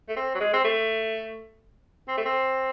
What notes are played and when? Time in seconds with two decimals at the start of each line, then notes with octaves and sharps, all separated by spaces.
0.08 A3
0.16 C4
0.35 F#3
0.40 G#3
0.54 C4
0.64 A3
2.08 C4
2.17 A3
2.25 C4